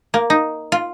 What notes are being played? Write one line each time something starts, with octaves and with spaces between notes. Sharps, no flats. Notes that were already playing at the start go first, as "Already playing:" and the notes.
A#3
D#4
F4